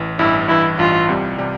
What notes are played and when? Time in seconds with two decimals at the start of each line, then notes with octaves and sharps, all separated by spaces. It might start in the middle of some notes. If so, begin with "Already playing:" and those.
Already playing: A1 E3
0.19 A1 G2 E3 E4
0.48 A1 G2 E3 E4
0.78 A1 G2 E3 F4
1.09 C2 C3 G3
1.38 C3 G3